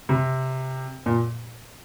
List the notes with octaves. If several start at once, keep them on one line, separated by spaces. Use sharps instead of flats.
C3
A#2